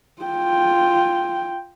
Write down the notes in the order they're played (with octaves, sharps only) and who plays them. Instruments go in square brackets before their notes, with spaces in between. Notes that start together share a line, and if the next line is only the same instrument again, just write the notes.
[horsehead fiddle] F4 G5